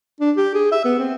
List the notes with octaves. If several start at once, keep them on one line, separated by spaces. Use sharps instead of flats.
D4
G4
G#4
E5
B3
C4